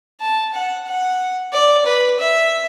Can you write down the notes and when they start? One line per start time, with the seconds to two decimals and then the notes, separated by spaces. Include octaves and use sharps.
0.21 A5
0.54 F#5
0.87 F#5
1.53 D5
1.86 B4
2.19 E5